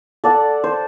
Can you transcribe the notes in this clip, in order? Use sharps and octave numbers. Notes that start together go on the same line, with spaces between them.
A4 D5 F#5
C5